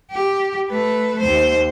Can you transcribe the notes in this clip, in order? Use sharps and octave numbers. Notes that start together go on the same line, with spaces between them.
G4
A3 B4
D#2 C5